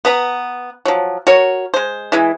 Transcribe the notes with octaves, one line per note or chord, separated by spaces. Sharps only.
B3 B4 A#5
F3 F#3
F#4 A#4 C#5
G#3 C5
E3 G#3 E4